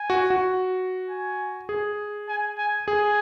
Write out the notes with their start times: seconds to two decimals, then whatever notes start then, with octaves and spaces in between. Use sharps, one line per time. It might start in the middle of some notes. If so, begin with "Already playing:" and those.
Already playing: G#5
0.10 F#4
0.30 F#4
1.10 G#5
1.69 G#4
2.28 G#5
2.58 G#5
2.88 G#4 G#5